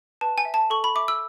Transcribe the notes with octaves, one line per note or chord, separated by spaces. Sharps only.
B4 A5
G#5
E5
A5
A4 C#6
B5
E5 D6
E6